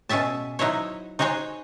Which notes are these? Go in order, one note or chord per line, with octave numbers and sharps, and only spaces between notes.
B2 C#4 G#4 E5 A5
F#3 D#4 E4 C5 C#5
D#4 F#4 G#4 C5 C#5